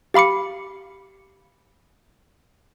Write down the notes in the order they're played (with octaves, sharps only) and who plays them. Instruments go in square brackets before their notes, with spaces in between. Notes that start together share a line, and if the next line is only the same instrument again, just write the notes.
[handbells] G4 F5 B5 D6 C#7